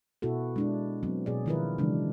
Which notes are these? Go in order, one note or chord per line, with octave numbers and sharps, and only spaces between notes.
B2 B3 E4 F#4 A4
G#3 D4 E4
F#3 B3 C4
B2 G#4 D5
D#3 F3 E4 F4 A#4 B4
C#3 E3 F#3 G#3 D4